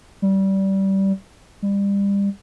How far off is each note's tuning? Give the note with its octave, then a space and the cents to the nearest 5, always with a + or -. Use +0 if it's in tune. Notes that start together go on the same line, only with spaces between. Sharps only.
G3 -20
G3 +30